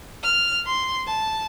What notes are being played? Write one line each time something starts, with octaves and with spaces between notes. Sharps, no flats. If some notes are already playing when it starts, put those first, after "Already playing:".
F6
C6
A5